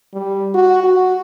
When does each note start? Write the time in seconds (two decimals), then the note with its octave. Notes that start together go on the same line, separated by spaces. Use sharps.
0.14 G3
0.55 F#4
0.84 F#4